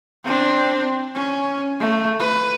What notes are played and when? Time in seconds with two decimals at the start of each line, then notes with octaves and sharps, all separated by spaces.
0.24 C4 D4
1.15 C#4
1.80 A3
2.19 B4